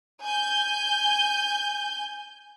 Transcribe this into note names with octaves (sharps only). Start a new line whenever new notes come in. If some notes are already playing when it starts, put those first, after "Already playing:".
G#5 G6